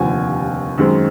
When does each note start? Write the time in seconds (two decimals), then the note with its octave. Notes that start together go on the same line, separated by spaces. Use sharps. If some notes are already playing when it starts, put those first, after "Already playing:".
Already playing: F1 D#2 D3 F3 G#5
0.78 F#2 D#3 G#3 C4